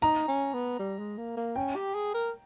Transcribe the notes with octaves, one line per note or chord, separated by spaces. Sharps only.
D#4 A#5
C#4
B3
G3
G#3
A#3
A#3
C#4 G5
G4
G#4
A#4